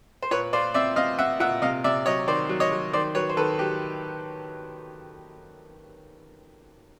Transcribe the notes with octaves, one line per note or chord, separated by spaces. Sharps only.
C5
A#2 B4 C#5
F4 C5 D5
C4 D5 E5
C4 D#5 F5
C4 E5 F#5
A#2 E5 F#5
C3 D#5 F5
C3 D5 E5
F#3 C#5 D#5
D#3 C5 D5
F#3
C#5 D#5
F#3
D#3 C5 D5
F#3 B4 C#5
C5
D#3 A4 B4
F#3 G4